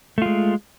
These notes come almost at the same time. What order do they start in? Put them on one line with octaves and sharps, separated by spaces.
A3 F4 G#3